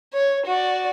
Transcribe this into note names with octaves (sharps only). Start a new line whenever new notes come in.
C#5
F#4 D5